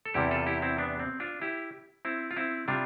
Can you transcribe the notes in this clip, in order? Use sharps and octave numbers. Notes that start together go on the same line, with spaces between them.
A4
E2 C3 G3 E4 G4
F4 A4
E4 G4
C4 E4
B3 D4
C4
D4 F4
E4 G4
C4 E4
F4
C4 E4
C3 G3 D4 F4